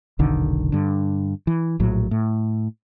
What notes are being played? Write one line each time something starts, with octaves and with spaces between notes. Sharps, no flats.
F1 B1 D3 D#3
G2 D3
E3
A#1 A2 F#3
A2